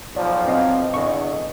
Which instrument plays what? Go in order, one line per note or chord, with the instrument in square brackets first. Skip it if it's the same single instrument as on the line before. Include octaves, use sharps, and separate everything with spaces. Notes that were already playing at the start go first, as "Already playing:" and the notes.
[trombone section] B1 F3 [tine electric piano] D5
[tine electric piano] C4 D#5 F5
[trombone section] E2 D3 [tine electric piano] D#5 C#6